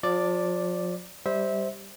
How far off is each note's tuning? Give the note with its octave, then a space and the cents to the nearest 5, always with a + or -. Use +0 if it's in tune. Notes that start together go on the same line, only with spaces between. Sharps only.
F3 +35 D5 +0
G3 +0 C5 +0 E5 -25